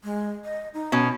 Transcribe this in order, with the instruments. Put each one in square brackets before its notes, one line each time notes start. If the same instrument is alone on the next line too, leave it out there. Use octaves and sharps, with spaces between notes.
[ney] G#3
D#5
D#4
[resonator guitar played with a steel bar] B2 C#4